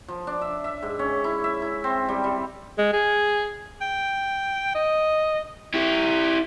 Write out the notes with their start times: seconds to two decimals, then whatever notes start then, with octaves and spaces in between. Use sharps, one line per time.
0.08 F3
0.27 D4
0.41 E5
0.64 E5
0.83 G#2
0.99 C#4
1.24 E4
1.44 E5
1.62 E4
1.84 C4
2.08 G3
2.24 G3
2.78 G#3
2.93 G#4
3.82 G5
4.75 D#5
5.74 E4 G4